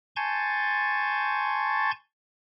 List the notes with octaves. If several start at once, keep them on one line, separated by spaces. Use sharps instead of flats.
G#5 A5 C6 C#6 G6 A6